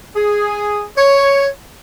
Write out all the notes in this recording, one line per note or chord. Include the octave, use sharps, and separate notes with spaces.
G#4
C#5